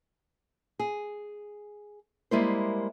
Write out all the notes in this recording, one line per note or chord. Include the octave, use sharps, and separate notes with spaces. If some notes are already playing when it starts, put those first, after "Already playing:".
G#4
G3 G#3 A#3 E4 A#4 C5